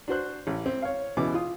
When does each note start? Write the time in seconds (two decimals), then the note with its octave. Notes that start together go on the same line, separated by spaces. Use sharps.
0.08 D4 F#4 C5 F#6
0.47 A1
0.66 C4
0.82 C#5 F5
1.17 C#2 B2 E3 D6
1.34 F4 D#6